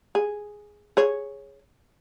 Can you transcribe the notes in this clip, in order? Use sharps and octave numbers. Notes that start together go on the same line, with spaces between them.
G#4
G#4 C#5